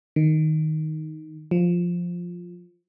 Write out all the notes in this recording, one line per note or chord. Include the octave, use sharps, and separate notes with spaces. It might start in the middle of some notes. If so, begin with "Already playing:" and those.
D#3
F3